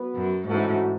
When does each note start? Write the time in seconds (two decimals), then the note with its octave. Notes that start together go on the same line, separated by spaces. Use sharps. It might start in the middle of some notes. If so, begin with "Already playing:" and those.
Already playing: F#3 B3 F#4 B4
0.15 F#2
0.46 G#2 E3 A3 C#4 F#4